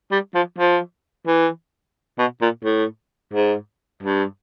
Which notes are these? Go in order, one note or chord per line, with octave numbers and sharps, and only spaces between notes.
G3
F3
F3
E3
B2
A#2
A2
G#2
G2